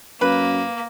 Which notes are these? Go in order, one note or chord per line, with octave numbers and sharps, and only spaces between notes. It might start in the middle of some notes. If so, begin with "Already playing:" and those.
F#2 A#3 B4